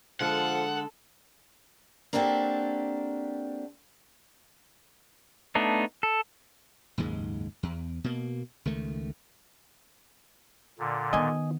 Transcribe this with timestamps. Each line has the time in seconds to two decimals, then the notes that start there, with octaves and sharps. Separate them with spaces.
0.20 D3 F3 G#3 A4 F#5
2.13 A#3 C4 D4 F#4 G4 A4
5.55 A3 B3 D4 D#4
6.03 A4
6.98 F#1 D#2 G#2 G#3
7.63 E2
8.04 B2 A#3
8.65 C#2 D#3 A3
10.79 A#2 D3
11.13 D#3 B3 D#5 G#5